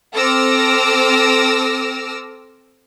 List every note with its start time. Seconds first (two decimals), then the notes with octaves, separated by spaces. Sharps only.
0.14 C4 A4 D6 E6 F6 A#6